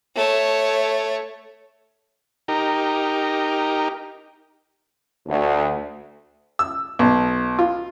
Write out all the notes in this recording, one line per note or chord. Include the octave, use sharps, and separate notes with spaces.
A3 C#5
D#4 G4 A#4
D2
E6
B1
F4